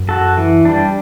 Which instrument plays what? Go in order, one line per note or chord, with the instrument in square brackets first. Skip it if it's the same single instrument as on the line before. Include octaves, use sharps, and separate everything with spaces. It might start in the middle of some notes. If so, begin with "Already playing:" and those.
Already playing: [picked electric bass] F#2
[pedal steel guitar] F#4 A4
E3
G3 D4